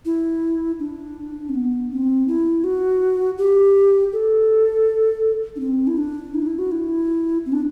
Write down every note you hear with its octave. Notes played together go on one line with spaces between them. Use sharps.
E4
D4
C4
B3
C4
E4
F#4
G4
A4
D4
C4
E4
D4
E4
D4
E4
F#4
E4
C4
D4